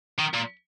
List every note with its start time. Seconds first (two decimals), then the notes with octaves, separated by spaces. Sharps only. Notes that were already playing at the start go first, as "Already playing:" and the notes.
0.19 D#3
0.34 A#2